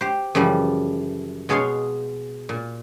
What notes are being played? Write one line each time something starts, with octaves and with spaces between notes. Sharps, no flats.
G4 C5
F#2 C#3 E3 F3 G3
B2 G#3 G#4 C#5 F5 C6
A#2